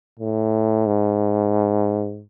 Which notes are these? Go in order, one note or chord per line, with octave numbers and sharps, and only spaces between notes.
A2
G#2